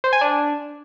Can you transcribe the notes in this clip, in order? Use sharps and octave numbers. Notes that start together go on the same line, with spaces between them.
C5
G#5
D4